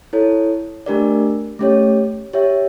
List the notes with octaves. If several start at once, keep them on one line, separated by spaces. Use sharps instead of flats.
E4 A4 C#5
A3 D4 G4 A#4 D5
A3 C#4 G4 C#5
G4 C#5 E5